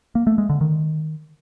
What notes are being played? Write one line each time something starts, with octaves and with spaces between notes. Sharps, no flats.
A#3
A3
G#3
D3
D#3